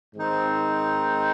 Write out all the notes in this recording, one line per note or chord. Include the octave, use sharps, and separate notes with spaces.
G#2 D#3 C4 D#4